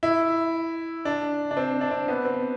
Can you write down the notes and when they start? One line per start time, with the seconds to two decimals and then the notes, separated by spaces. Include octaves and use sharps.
0.03 E4
1.05 D4
1.51 D4
1.57 C4
1.81 D4
1.91 C4
2.08 B3
2.25 C4